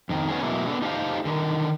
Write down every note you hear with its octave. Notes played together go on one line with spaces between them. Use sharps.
F2 D#3
D#3 B3 C#4 G#4
B2 F#3 G#3 A#3 E4
B3 D4 A4
D#4 G4 A4 C5 D#5 F5
D3 D#3